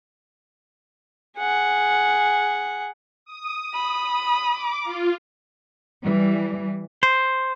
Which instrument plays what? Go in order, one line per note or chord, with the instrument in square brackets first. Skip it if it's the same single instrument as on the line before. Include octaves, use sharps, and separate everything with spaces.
[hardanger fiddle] G#4 F#5
[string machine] D#6
[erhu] B5
[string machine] D6
F4
[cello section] E3 G3
[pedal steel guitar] C5